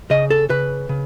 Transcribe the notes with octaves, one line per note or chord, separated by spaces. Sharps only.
C#3 D#5
A4
C#3 B4
C#3